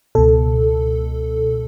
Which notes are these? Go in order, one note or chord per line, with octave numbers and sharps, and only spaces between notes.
C#2 B2 A4